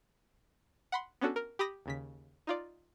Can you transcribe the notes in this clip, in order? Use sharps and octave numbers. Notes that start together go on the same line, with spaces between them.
F#5 B5 C6
B3 C#4 D4 F#4 A4
A#4
G4 B5 D#6 A#6
D#2 C#3 B6
D#4 F4 D5